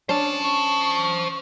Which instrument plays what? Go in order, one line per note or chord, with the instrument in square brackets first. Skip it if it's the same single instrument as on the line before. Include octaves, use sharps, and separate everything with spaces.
[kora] C#4 D4 [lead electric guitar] C5 A5
[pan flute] C#6